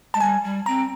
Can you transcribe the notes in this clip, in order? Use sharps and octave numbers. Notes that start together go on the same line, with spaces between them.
G#3 A5
G3 G#5
G3
C4 A#5